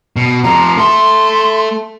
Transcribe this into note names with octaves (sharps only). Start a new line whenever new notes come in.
B2
C3 F3 A#5
A3 A4 C6